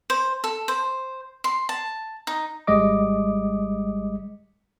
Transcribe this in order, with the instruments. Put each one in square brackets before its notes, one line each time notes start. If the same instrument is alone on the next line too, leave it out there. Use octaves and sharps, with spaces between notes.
[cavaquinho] C5
A4
C5
C6
A5
D#4
[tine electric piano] G#1 G3 G#3 D#5 D6